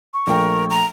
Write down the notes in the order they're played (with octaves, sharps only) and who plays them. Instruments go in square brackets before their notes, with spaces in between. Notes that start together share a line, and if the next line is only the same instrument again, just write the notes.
[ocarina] C#6
[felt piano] A#1 A3 G5 [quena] A#4
[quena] A#5